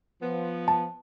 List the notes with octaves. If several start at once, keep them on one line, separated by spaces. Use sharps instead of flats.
F3 B3
A5